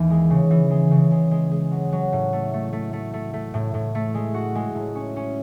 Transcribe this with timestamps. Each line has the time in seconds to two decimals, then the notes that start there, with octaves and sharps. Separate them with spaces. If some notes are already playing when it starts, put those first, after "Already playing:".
Already playing: D#2 E3
0.10 G#3
0.30 C#3
0.51 E3
0.70 G#3
0.91 C#3
1.11 G#3
1.31 G#3
1.51 G#3
1.72 F#3
1.92 F#3
2.13 A2
2.33 A3
2.53 A3
2.73 A3
2.93 A3
3.13 A3
3.33 A3
3.54 A2
3.74 A2
3.95 A3
4.14 G#3
4.34 F#4
4.55 G#3
4.75 A2
4.95 C#4
5.16 C#4